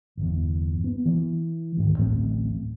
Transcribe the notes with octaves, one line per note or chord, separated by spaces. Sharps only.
G1 E2
B3
E3
D2 G#2 D#3
D1 A1 A3 C4